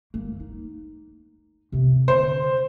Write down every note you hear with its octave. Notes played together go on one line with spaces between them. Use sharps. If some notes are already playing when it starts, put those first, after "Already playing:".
A#3
D#4
C3 B3
D3 C5